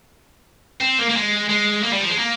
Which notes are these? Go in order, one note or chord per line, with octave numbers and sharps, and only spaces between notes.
C4
A#3
A#3
G#3
G#3
A#3
G3
F3
G#3
A#3